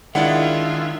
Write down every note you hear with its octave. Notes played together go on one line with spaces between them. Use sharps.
D#3 G#3 D4 E4 F4 D5 E5 F#5